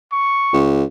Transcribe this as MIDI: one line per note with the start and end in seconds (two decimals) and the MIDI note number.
0.12 0.67 85
0.53 0.84 37